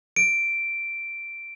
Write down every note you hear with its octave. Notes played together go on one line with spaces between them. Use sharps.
D7